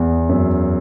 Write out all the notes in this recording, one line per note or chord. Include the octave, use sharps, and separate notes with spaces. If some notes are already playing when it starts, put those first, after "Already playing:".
Already playing: E2
F#2